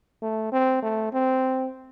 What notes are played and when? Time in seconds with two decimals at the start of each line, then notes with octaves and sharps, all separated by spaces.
0.22 A3
0.52 C4
0.83 A3
1.13 C4